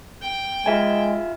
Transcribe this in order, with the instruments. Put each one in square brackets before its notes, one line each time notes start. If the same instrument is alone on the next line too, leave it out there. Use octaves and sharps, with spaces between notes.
[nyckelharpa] G5
[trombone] G#3 [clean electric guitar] F4 E5 G#5